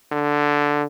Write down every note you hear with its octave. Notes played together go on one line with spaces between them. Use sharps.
D3